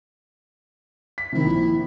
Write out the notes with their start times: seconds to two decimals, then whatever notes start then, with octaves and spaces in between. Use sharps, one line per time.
1.18 B6
1.32 C3 D#3 E4
1.45 A#1